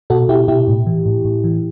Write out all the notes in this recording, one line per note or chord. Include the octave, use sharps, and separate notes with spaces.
B2 F#4 A4
B2 E4 G4
B2 E4 G4
A2
E3
A2
A2
E3